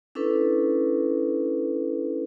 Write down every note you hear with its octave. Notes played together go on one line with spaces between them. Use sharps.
C#4 D4 E4 A4 B4